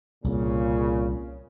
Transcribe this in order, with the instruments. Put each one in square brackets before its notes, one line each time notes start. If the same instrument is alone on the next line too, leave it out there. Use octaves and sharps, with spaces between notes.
[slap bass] C2 [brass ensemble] A#2 C#3